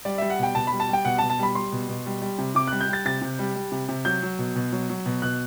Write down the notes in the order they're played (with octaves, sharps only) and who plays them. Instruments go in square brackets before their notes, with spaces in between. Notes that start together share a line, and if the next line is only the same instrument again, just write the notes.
[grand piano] G3 D5
G3 E5
F#5
B2 G5
B2 A5
G3 B5
A5
G3 G5
B2 F#5
A5
B2
A5
G3 B5
G3 C6
B2
B2
G3
G3
C3
C3 D6
G3 F#6
G6
G3 A6
C3 A6
C3
G3
G3
C3
C3
F#3 G6
F#3
B2
B2
F#3
F#3
B2
B2 F#6